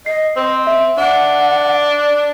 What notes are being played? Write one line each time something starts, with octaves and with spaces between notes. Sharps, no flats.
D#5 C7
C4
E5
D4 F#5
D5